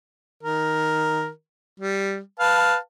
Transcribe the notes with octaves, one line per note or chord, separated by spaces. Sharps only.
D#3 A#4
G3
B4 F5 A5